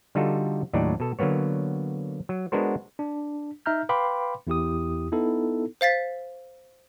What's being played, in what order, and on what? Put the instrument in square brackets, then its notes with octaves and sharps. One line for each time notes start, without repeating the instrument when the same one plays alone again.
[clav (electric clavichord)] D3 G3 D#4 F4 F#4 A4
D#2 A2 F#3 D4 D#4 D5
B2 A4
D3 F#3 A#3 B3 C#5
F#3
G#3 B3 D4 F#4 A#4 C5
[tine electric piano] D4
D#4 E5 A#5 F6 G6
B4 F5 G5 B5 C6 D6
E2 E4 G4 D#6
B3 D#4 E4 A4
[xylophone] C5 F5 A6 B6